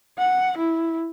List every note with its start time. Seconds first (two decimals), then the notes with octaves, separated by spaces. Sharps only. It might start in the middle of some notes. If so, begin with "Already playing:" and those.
0.18 F#5
0.58 E4